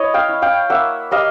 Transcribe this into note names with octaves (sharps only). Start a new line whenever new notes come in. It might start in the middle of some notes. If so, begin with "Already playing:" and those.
Already playing: E4 C#5 D#5
F5 G5
E4
F5 G5
A#3 E5 F#5
G3 D#5 F5